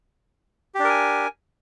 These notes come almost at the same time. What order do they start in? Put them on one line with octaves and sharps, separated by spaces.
G4 D4 A#4 G#5